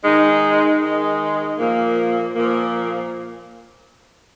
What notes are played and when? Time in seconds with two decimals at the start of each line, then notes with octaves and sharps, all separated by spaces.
0.04 D#3 G#3 D#4
0.81 D#3 G#3 D#4
1.58 A#2 F3 A#3
2.35 A#2 F3 A#3